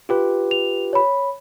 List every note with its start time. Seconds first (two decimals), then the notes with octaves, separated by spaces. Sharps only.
0.09 F4 G4 B4
0.51 F7
0.93 C#5 B5